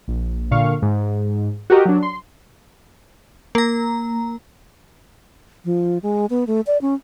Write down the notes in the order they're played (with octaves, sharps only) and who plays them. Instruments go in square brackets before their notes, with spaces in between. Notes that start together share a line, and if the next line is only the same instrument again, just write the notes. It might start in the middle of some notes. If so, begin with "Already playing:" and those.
[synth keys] A#1
A#2 D3 F5 C#6
G#2
F#4 G4 A#4 D#5
F#3 D4
C6
[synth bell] A#3 A#5
[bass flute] F3
G#3
B3
A3
D5
C#4